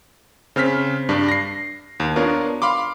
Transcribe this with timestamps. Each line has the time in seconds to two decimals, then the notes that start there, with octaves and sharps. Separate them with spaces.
0.56 C#3 C4 F6 B6
1.09 G2 D4
1.28 A#6 C7
2.00 D#2
2.16 B3 D4 F4 A#4 C#5
2.62 F5 B5 C6 D6